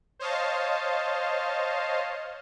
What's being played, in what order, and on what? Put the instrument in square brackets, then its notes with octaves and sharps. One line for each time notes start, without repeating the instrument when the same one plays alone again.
[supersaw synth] C5 C#5 D#5 F5 A5